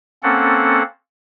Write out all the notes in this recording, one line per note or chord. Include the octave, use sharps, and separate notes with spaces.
A#3 C4 C#4 A4 F#5